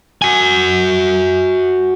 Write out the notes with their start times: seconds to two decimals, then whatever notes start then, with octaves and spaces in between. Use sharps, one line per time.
0.22 F#4 G#5